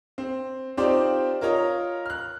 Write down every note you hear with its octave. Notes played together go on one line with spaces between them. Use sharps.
C4
C4 D#4 F4 G4 C5 D5
F4 A#4 C#5 D#5 A#5
F6 F#6